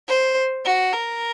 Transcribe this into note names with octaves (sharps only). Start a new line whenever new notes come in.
C5
F#4
A#4